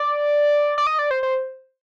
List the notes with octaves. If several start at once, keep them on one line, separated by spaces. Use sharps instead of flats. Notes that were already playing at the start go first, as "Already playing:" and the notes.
Already playing: D5
D5
D#5
D5
C5
C5